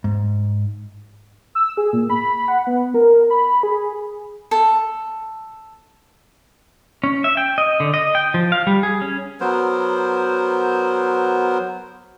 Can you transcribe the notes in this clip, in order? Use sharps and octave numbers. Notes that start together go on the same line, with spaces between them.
G#2
E6
G#4
A#2
B5
F#5
B3
A#4
B5
G#4
A4
C#4
E5
G5
D#5
D3
D#5
G5
F3
F5
G3
G#4
C#4
F#3 B3 A#4 C5